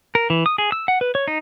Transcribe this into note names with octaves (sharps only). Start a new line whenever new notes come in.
A#4
E3
D#6
G#4
E6
F#5
B4
C#5
D#4